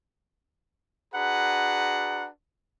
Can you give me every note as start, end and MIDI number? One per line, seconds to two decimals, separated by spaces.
1.15 2.28 62
1.15 2.28 66
1.15 2.28 68
1.15 2.28 71
1.15 2.28 78
1.15 2.28 82